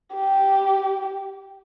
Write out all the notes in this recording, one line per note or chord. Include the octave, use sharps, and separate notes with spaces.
G4